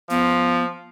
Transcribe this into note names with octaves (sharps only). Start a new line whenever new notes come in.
F3 B3